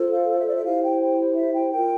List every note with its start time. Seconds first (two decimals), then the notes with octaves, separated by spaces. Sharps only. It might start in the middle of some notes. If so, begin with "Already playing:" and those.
Already playing: F4 A4 C5
0.12 F5
0.38 E5
0.47 D5
0.55 E5
0.65 E4 G4 C5 F5
0.82 G5
1.00 G5
1.35 E5
1.54 G5
1.72 F4 A#4 G5